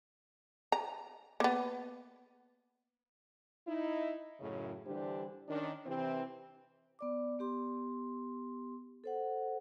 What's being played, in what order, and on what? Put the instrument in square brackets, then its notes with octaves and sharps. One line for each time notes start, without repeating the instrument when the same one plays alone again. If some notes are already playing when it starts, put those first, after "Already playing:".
[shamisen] A#5
A#3 B3
[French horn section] D#4 E4
F#2 A2 C#3
D3 E3 G3 D4 G4 C5
D#3 C#4 D4
C3 E3 C4
[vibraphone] B3 D5 D6
B3 G4 C6
A4 C5 F#5